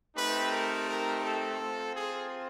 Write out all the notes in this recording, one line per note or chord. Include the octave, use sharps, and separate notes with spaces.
A3 C4 D#4 G4 B4
A#4
A#4
A4
C4 F4
G#4